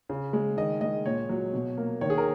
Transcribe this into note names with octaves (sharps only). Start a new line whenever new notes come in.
C#3
G#3
D#3 D#5
G#3 D#5
A#2 C#5
F#3
B2
A#3
D#3 C#5
G#4
A#4